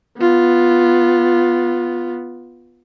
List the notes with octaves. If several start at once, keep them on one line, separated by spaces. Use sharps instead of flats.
B3 F4